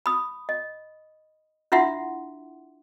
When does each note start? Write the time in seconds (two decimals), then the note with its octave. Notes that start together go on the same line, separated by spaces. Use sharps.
0.06 B5 D#6
0.49 D#5
1.72 D4 E4 F4 E5 F#5 C6